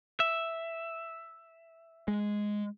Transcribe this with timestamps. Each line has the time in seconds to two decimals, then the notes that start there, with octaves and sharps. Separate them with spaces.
0.20 E5
2.08 G#3